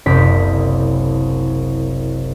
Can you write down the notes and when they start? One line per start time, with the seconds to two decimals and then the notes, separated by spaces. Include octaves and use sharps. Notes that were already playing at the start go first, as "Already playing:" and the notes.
0.06 F#1 C2 D5 G6 B6